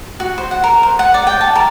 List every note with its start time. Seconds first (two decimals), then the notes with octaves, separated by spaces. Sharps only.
0.20 F#4
0.38 C5
0.51 F#5
0.64 A#4
0.83 C5
0.99 F#5
1.14 D5
1.27 G5
1.41 A5
1.55 A#4